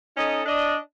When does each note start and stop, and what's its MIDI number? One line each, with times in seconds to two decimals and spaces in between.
0.17 0.41 61
0.17 0.41 63
0.17 0.41 69
0.17 0.41 75
0.46 0.77 62
0.46 0.77 75